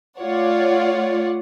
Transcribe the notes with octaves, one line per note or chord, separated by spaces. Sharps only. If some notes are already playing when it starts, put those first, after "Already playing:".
A3 F4 C#5 D5 F#5